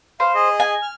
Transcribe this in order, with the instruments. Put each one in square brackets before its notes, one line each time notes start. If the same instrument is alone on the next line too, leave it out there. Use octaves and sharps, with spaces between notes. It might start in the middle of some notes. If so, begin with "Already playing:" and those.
[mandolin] C5 [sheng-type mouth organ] F5
[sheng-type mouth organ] G#4 D#5
[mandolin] G#5
[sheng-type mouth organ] F6